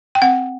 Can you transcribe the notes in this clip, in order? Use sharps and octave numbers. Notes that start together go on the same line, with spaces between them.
G5
C4 F#5